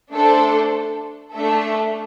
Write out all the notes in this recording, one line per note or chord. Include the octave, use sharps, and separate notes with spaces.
A3 D4 A4 C5
A3 D4 A4 E5